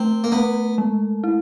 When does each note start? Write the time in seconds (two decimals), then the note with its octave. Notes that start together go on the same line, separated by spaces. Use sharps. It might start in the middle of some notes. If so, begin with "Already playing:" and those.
Already playing: A3 C4
0.24 A#3
0.32 A3 B3
0.78 G#3
1.24 E4